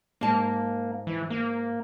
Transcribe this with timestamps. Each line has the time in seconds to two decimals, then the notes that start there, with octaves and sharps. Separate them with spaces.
0.21 G#2 A#3 A5
1.07 E3
1.30 A#3